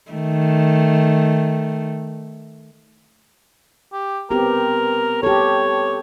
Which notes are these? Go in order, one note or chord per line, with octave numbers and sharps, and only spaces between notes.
D#3 A3
G4
B3 C4 G4 A#4
G4 A4 C#5